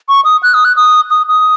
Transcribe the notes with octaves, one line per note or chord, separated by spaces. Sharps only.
C#6
D#6
F#6
D#6
F#6
D#6
D#6
D#6